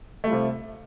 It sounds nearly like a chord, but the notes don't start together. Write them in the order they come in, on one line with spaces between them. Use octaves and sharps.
A3 G3 F4 C3